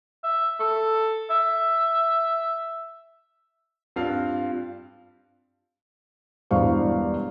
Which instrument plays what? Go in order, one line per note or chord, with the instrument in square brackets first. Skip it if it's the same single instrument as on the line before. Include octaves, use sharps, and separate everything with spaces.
[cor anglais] E5
A4
E5
[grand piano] G2 C4 F4 F5
[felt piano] E1 G2 E4 C5 F5 C#6